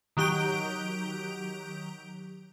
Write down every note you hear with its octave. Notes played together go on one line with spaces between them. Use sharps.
D#3 F#3 G4 A#5 G6 D7